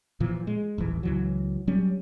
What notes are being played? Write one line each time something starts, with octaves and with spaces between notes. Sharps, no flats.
A#2 E3 F3
G#3
D#1 A1 E3
C#2 E3 F#3
F#3 G3 C#4